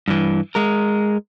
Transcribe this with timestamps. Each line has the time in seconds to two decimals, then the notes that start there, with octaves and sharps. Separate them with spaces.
0.08 G2 E3
0.55 G#3 A#4